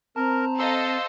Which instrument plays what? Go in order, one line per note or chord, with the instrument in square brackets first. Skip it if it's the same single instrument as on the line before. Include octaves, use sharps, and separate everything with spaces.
[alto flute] C4 [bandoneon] A#4 [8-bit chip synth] A5 A#5
[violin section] A4 D#5 F5 [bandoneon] C5 C6 E6